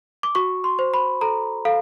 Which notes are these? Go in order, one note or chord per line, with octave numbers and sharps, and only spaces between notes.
D6
F#4 C#6
C6
C5
B5
A4 A#5
A4 F5